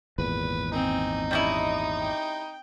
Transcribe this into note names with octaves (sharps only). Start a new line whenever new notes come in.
G#1 E2 A#2 B4
C4 D#4 G#5
G3 C#4 E4 D#5
G5